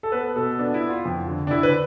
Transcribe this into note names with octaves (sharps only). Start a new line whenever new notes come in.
A4
B3 B4
B2 A4
B3 D4
E4
B3
F4
F2
D3
D4
D3 E4
B4